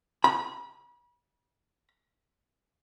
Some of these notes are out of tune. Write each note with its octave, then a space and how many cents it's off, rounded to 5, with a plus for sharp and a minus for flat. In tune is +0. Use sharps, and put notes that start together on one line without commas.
B5 -35